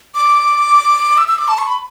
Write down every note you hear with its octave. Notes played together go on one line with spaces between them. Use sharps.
D6
E6
E6
D6
A5
C#6
B5